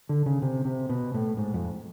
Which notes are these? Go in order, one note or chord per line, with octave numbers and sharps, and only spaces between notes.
D3
C#3
C3
C3
B2
A2
G#2
F2